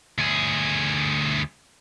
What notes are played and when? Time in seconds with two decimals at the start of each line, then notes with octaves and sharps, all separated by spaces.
0.18 D2 G#4